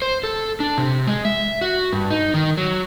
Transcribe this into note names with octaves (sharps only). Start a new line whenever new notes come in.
C5
A4
D4
C3
G#3
E5
F#4
G2
D#4
D#3
F#3